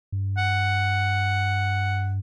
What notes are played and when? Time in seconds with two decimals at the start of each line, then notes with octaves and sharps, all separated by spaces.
0.12 G2
0.38 F#5